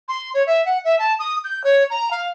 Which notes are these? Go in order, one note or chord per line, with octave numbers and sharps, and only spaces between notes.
C6
C#5
E5
F#5
E5
A5
D#6
G6
C#5
A#5
F5